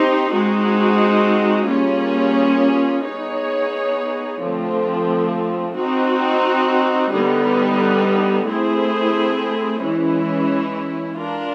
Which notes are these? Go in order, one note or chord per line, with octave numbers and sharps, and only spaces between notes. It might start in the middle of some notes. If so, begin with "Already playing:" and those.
Already playing: C4 D#4 G4 C5
G#3 C4 D#4 F#4
G3 A#3 C#4 F4 G#4
B3 D#4 G#4 C#5
D3 F3 A3 C4
C4 D#4 F#4
D3 G3 B3 D#4
A3 C4 E4 G#4 C5
E3 G#3 C#4 E4
D4 F4 A#4